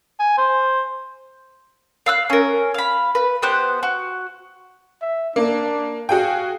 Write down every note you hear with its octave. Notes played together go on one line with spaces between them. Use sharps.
G#5
C5
F5 E6 F#6
C#4 A#4
F5 B5
B4
B3 G4 C5 F#6
F#4
E5
A#3 D4
F#4 G#4 F5 G5